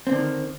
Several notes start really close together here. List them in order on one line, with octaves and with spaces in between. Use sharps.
C4 D3 D#3